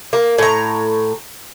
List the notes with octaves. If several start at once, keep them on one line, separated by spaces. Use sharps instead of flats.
A#3
A2 A#5